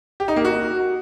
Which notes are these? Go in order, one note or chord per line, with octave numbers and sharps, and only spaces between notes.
G4
D#4
A#3
F#4